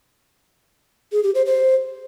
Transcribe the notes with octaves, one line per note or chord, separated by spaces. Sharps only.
G#4
G4
C5
C5